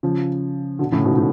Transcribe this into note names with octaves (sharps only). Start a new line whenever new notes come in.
C#3 F3
B2 D3
A2 C#3
G#2 B2
A2